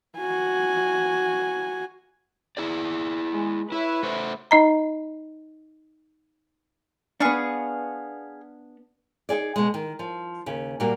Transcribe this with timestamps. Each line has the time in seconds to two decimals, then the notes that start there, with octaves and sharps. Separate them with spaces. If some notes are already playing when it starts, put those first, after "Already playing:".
0.18 F#4 G#5
2.57 E4 G#4 D5
3.34 G#3
3.72 E4 B4 C#5 E5
4.03 A3 C5
4.51 D#4 D#5 A#5
7.20 B3 D4 G#4 F5 C#6
9.29 D#4 F4 G#4 D5
9.56 B2 G#3
9.74 D#3
9.99 F3
10.46 D#2 C#3
10.80 A#2 G3 A#3 F#4